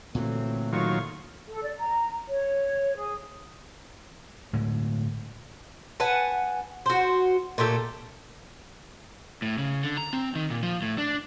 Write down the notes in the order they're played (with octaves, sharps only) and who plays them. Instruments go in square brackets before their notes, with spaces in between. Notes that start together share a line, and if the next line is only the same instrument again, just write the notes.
[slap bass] A#2 D3 E3 [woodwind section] F#3 C4 [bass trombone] A3
[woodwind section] A2 C#6 [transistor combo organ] D#3 F#3 F4
[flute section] A4
D5
A#5
C#5
G#4
[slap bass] A2 D3 G#3
[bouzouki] B4 F#5 G#5 A5
F#4 C5
A#2 A3 G4 A4
[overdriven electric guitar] A2
C#3
D3
A#5
C4
D#3
A#2
F3
A2
D4